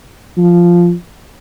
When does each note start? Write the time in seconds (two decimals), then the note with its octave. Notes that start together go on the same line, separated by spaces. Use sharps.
0.38 F3